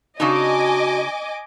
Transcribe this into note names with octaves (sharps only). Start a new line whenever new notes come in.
C#3 D4 D#4 F#4 D#5 G#5 D6